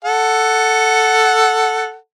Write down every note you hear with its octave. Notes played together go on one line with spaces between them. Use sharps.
A4 F#5